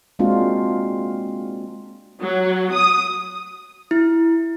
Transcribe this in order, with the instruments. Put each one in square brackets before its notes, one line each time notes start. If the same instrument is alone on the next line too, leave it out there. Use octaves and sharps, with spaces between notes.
[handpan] G#3 A#3 C4 D4 F4 F#4
[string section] F#3
D#6
[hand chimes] E4